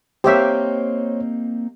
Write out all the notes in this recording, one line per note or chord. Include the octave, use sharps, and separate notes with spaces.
A#3 C4 D#4 G4 C5 C#5 E5